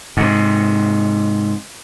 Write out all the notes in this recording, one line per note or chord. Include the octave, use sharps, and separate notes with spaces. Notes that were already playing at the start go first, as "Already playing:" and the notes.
G#2 C3